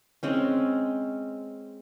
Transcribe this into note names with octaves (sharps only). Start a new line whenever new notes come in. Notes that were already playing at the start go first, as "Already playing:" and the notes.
G#3 C4 C#4